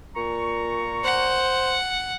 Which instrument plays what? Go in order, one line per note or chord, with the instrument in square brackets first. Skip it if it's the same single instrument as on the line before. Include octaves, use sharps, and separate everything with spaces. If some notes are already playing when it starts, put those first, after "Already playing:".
[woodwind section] A#2 A#5 C#6
[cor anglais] C5 [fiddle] F#5